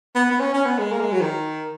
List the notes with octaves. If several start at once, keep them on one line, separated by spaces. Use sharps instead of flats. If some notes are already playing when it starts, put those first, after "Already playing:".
B3
B3
C#4
C#4
B3
G#3
A#3
G#3
F#3
D#3